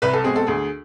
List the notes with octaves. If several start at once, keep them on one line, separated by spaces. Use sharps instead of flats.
C2 B4
A4
B2 G#3 C4 G#4
A4
D2 G#4